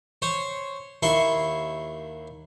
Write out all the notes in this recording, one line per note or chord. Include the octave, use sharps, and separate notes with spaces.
C5 C#5
D#2 E4 C6 C#6